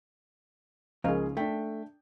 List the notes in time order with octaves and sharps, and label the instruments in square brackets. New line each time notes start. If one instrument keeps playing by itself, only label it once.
[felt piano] C#2 G#4 [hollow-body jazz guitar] C#3 F4 [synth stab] F3 A#3 D#4
[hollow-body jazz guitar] A3 [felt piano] D4 G5